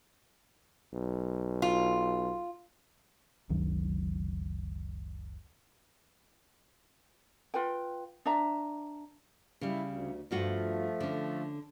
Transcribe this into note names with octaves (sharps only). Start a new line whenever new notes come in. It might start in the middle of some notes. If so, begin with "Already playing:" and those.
B1
F4
F#1 C#2 D#3 F#3
F4 B4 G5
D4 E5 A#5
C#3 G3 E4
D2
G2 F3 A3 F4 F#4
D3 C#4